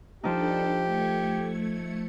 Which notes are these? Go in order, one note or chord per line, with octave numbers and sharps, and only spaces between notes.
F3 D4 D#4 G4 A4
A3 G#6 C#7